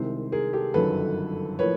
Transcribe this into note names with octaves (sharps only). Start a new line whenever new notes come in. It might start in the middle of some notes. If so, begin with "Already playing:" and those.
Already playing: C2 C3 D#3 G#3 C4
G#4 A#4
G4 A4
G1 F#2 D#3 F#3 A4 B4
A2 F3 A#3 B4 C#5